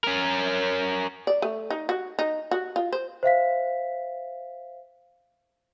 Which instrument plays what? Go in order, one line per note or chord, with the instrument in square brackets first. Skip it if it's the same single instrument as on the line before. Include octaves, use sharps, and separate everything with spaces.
[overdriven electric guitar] C#4 A#4
[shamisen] D5
A3
D#4
F#4
D#4
F#4
F4
C5
[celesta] C5 E5 F5 B6